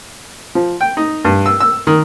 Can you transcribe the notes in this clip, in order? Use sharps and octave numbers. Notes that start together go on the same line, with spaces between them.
F3
G5
D#4
G2
E6
E6
D#3